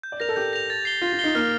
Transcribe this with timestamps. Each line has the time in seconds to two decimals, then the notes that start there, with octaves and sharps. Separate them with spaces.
0.03 G6
0.12 D5
0.20 A#4 A#6 F7
0.29 A4
0.36 G4 G6
0.53 A#6 F7
0.70 A6
0.85 C7 G7
1.02 F4 A6
1.13 F4
1.19 D#4 C7 G7
1.35 A#3 F6